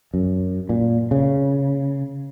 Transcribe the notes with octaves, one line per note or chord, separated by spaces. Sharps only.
F#2
A#2
C#3